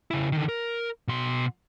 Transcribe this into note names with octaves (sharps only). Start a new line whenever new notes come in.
C#3 E4
D3 D#3
A#4
B2 C6